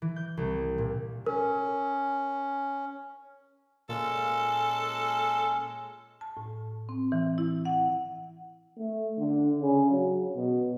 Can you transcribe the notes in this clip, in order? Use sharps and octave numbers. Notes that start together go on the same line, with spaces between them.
E3
G6
C2
A#2
C#4 A#4
A#2 G#3 C#4 A4
A5
A2
C4
E3
E4
F#5
A3
D3
C#3
F#3
B2